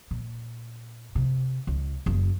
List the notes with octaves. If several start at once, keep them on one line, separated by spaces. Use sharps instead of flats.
A#2
C3
C#2
F#1